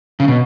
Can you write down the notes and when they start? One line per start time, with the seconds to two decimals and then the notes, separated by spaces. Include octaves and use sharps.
0.20 C#3
0.28 B2